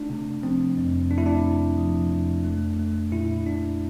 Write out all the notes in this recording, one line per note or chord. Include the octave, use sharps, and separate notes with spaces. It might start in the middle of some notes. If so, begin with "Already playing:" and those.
Already playing: A3 D4
C3
F3 C4
F2
A3 D4
E4
D4
C3
F3
F2
A3
A3
A#2 E4
A#2 D4